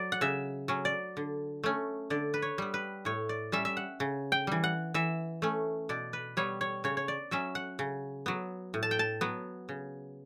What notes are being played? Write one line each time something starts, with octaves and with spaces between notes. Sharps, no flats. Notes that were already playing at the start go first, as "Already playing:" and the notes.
Already playing: F#3 D5
F#5
C#3 E5
F#3 C#4
D5
D3
A3 C#4
D3 D5
B4
C#5
G3 B3
B4
A2 C#5
D5
G3 C#4 E5
E5
F#5
C#3
G5
E3 G3
F#5
E3 E5
A3 C#4
B2 D5
B4
G3 B3 C#5
C#5
C#3 C#5
C#5
D5
F#3 C#4 E5
F#5
C#3
F#3 B3
A2
A5
G5
A5
F#3 B3
C#3